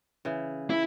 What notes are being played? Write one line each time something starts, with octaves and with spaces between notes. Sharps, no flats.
C#3 E3
E4